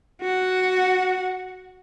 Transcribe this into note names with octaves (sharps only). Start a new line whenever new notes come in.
F#4 F#5